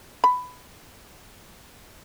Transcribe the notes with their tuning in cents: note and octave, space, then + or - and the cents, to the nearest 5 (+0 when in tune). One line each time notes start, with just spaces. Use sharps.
B5 +15